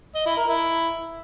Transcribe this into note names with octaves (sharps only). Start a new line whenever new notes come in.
D#5
E4
A#4
E4